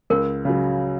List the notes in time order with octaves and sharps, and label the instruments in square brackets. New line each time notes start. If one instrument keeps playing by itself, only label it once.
[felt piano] C#2 [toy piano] A#4
[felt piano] C#3 F#3